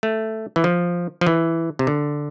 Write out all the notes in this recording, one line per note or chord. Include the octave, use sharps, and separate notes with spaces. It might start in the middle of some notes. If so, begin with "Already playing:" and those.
A3
E3
F3
F3
E3
C3
D3